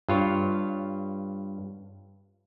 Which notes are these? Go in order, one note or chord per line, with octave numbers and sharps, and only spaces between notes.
G2 F4 C#5